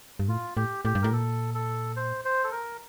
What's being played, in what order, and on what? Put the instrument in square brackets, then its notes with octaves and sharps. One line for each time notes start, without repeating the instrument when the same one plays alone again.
[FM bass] G2
[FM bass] A2 [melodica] F4
[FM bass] A2 [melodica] G4
[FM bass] A2 [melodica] G4
[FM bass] G2
[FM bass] A2 [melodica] A#4
[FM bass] A#2 [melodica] A4
[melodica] A4
C5
C5
A4
A#4